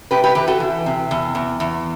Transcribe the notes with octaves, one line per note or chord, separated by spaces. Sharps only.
C3 G4 B4
G4 B4
E3 G4 B4
F#4 A4
E3
C3
E2
E2
E2